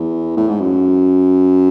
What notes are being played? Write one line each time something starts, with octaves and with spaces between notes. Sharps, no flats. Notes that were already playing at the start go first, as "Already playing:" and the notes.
Already playing: E2
A2
G#2
F#2